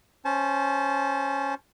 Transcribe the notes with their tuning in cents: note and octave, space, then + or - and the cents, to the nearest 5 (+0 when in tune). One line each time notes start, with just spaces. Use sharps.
C#4 -10 C5 +0 A5 -30